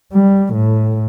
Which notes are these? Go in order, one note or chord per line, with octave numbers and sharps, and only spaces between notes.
G3
A2